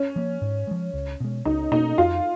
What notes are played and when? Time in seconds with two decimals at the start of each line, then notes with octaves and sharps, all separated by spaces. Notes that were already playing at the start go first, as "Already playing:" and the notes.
Already playing: C#4
0.16 F3 A#3
0.42 G#2
0.67 F3 G#3
0.94 C#2
1.20 B2 G#3
1.45 C#2 D#4
1.72 B2 A#3 D#4
1.98 F2 F4